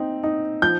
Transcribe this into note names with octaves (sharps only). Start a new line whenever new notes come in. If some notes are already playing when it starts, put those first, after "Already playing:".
Already playing: C4 D#4
D#4
F3 G6